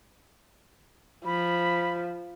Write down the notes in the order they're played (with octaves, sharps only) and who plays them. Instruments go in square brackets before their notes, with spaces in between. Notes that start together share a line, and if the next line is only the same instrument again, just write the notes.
[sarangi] F3 [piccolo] B5